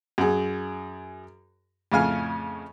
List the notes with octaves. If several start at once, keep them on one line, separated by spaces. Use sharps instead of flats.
F#2 G#4
F2 A2 C#3 F5 G#5 F6